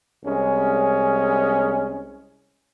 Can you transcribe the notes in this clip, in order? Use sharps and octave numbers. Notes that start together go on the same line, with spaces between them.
C2 G#3 C#4